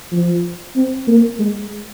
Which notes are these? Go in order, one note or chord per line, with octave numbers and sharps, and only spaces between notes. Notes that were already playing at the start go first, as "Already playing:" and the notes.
F3
C4
A#3
G#3